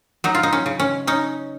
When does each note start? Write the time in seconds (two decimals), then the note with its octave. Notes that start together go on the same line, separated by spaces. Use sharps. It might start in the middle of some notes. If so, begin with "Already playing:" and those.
0.24 F#3 D#4
0.35 F4
0.43 D#4
0.53 C#4
0.66 C#3
0.80 C#4
1.07 C#4 D#4